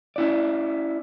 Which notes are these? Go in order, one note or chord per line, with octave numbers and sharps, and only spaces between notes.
C#4 E4 D5